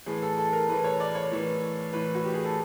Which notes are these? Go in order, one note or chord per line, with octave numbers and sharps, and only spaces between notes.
A2 E3 G#4
A4
A4
A#4
A2 E3 B4
C#5
D5
C#5
A2 E3
A2 E3 B4
F#4
G4
G#4
A4